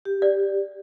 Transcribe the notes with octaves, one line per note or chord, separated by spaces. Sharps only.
G4
D5